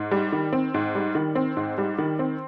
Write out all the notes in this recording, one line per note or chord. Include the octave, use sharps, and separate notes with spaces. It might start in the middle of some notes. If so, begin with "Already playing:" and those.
Already playing: G#2
G3
D#3
C4
G#2
G3
D#3
C4
G#2
G3
D#3
C4